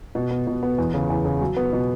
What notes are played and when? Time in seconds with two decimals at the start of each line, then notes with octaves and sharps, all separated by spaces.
0.15 B2
0.31 B3
0.47 B2
0.63 B3
0.78 E2
0.94 C#3
1.10 E2
1.25 C#3
1.42 F#3
1.57 B3
1.73 B2